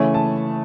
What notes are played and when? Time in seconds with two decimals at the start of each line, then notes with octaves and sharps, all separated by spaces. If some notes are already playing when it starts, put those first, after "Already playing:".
Already playing: C#3 E3 A3 C#4 G#5
0.14 A5